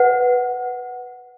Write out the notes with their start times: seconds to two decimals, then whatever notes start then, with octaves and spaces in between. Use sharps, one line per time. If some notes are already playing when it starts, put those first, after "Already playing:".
Already playing: B4 F#5